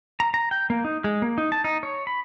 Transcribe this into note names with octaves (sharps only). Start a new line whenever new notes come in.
A#5
A#5
G5
A#3
D#4
G#3
A#3
D#4
A5
D#4
C#5
B5